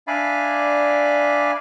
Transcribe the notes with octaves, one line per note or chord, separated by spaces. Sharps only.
D4 D5 E5 F5 G#5 B5